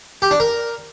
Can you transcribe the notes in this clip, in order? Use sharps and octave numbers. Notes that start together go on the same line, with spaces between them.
G4
D4
A#4